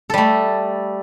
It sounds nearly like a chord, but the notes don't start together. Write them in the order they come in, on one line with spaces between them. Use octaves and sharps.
A4 G3 A3